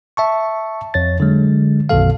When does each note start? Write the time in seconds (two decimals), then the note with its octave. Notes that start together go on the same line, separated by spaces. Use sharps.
0.17 E5 A5 C#6
0.94 F2 C#5 A6
1.20 D3 F#3 G#3
1.89 B1 F#2 B2 D#3 A4 F5